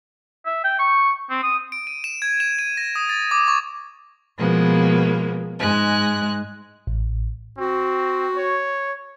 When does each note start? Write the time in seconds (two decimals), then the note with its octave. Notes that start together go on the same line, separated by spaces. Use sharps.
0.46 E5
0.64 G5
0.79 C#6
1.30 C4
1.43 D#6
1.72 D7
1.87 D#7
2.04 E7
2.22 G#6
2.40 E7
2.59 D#7
2.77 A#6
2.96 D#6
3.09 A6
3.31 D6
3.48 C#6
4.38 B2 F3 G#3 A#3 B3
5.59 G#2 G#3 F#6
6.87 A1
7.58 C4 F#4
8.37 C#5